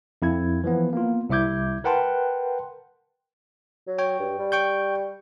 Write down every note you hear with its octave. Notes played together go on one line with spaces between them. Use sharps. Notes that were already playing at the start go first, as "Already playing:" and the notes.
F2 E4 G#6
E3 F3 B3
A#3 B3 F4
C2 E4 E5 D6 G6 G#6
A#4 B4 F#5 G5 A5 C6
F#3
C#5 G5
G2
G3
G5 C#6 G6